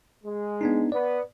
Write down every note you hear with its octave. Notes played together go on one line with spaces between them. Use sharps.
G#3
B3 D4 D#4
B3 D5